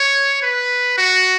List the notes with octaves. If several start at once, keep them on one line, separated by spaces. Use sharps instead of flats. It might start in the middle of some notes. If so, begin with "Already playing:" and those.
Already playing: C#5
B4
F#4